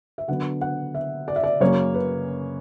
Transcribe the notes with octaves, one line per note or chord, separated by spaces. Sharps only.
E5
D3 F#3 B3 D4 F#5
F#5
E5
D5
E5
D5
F#2 C#3 F#3 A#3 C#5
B4